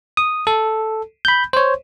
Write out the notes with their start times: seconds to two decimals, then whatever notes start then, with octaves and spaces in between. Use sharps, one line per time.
0.17 D#6
0.47 A4
1.25 B5 G6
1.53 C5 C#5